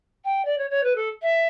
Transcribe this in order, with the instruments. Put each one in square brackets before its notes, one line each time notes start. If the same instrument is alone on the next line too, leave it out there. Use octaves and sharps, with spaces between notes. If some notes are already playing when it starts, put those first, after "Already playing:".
[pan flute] G5
D5
C#5
C#5
B4
A4
E5